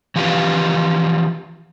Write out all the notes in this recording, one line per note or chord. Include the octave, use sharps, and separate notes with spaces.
E3 F3 F4 G4 B4